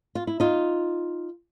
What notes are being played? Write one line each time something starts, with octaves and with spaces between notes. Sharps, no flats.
F4
E4
D#4 F4